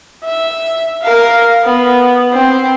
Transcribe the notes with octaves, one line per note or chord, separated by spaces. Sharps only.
E5
A#4 F5
B3
C4